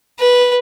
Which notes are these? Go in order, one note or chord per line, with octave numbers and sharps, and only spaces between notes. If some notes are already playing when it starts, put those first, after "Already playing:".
B4